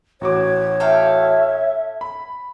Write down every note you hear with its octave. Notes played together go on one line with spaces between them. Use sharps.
A1 F#4 C#5 D6
A4 E5 F5 G5
B5